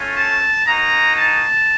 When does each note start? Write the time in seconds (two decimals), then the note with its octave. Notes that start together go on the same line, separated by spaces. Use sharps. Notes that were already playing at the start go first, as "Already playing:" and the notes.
Already playing: A3 C#4 F4
0.17 A5
0.66 A#3 D#4 F#4 A#5
1.16 A5